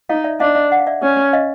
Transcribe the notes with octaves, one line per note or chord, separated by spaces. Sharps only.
D#4 D#5 F5
D5 E5
D4 D#5 F5
D#5 F5
F#5
F5
D5 E5
C#4
D#5 F5